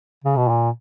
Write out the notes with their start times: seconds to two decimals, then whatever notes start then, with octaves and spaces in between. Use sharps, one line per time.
0.24 C#3
0.37 B2
0.48 A#2